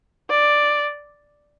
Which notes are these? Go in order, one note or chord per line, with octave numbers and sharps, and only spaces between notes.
D5